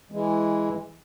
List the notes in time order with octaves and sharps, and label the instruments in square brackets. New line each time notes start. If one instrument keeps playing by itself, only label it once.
[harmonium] E3 G#3